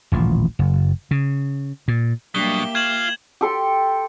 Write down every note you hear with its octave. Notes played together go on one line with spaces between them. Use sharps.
D#1 A1 F3
F#1
C#3
A#2
B2 F#3 G3 A#3 D4 G4 E5 G7
F4 C#6 G#6 E7 F#7
G4 A4 C6